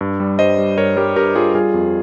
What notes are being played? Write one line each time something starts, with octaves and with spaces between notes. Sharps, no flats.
G2
G3
G2 C5 D#5
G3
G2 A#4 C#5
G3 G4 A#4
G2 G4 A#4
G3 F4 G#4
G3 F4 G#4
F2